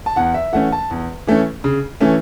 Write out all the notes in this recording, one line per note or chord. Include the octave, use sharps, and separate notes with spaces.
A5
E2 F#5
E5
E3 A3 C#4 F#5
A5
E2
E3 A3 C#4
C#3
E3 A3 C#4